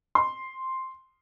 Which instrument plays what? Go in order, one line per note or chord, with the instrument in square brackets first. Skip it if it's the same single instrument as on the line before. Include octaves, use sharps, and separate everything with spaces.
[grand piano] C6